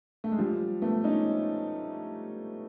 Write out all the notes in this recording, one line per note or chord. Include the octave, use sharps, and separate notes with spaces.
A3
G#3
F3 G3
A3 B3
C#4 D#4